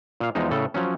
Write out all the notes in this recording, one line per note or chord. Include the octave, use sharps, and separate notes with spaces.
A#2 F5
E2 F3 G#3 D#4
A2 C#3 A4
F3 F#3 C#4